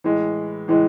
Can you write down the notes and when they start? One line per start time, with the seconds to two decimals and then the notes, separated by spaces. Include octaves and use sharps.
0.04 A2 E3 G#3
0.68 A2 E3 G#3